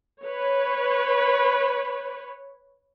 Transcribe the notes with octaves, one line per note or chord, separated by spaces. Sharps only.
B4 C#5